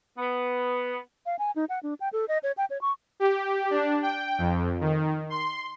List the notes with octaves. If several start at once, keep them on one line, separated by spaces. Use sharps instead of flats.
B3
F5
G#5
D#4
F#5
D4
G5
A4
D#5
C#5
G5
C#5
C#6
G4
D4
G5
F2
D#3
C6